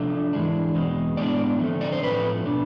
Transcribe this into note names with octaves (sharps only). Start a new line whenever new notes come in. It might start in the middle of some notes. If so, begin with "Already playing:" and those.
Already playing: C3 F3 A3 D4
G#2 E3 G#3 D4
E2 B2 G#3 C4
A2 G#3 B3 D4 D5
D3 F3 A3 C4
D5
C5
A2 F3 A3 C4 B4
B2 B3 D4